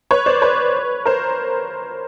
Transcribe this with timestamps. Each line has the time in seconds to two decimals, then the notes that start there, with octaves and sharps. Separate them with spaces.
0.11 B4 C#5
0.26 C5 D5
0.42 B4 C#5
1.06 A#4 C5